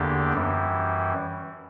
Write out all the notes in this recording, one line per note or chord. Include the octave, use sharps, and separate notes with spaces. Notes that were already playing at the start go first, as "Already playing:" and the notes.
Already playing: E2 D3 A#3 D4 G4
F#2 E3 G3